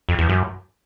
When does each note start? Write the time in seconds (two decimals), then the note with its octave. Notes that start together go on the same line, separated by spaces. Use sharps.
0.09 F2
0.19 E2
0.29 F#2